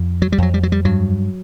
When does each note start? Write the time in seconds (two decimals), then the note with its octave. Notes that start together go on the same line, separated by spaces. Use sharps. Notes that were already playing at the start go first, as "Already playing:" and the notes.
Already playing: F2
0.22 F#3
0.32 G3
0.38 F2 F#3
0.54 G3
0.63 F#3
0.72 G3
0.85 G2 F#3